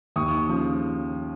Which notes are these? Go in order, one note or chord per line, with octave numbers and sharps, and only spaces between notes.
D#2 C#6 D#6
C#3 F3